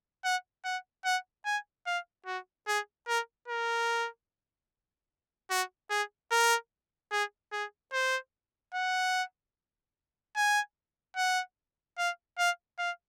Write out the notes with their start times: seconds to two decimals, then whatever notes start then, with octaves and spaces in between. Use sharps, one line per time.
0.24 F#5
0.65 F#5
1.05 F#5
1.45 G#5
1.86 F5
2.26 F#4
2.67 G#4
3.07 A#4
3.48 A#4
5.50 F#4
5.90 G#4
6.31 A#4
7.11 G#4
7.52 G#4
7.93 C5
8.74 F#5
10.36 G#5
11.17 F#5
11.98 F5
12.38 F5
12.78 F5